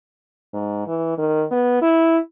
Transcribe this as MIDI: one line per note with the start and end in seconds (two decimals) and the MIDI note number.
0.54 0.86 44
0.87 1.13 52
1.18 1.44 51
1.51 1.77 59
1.82 2.18 64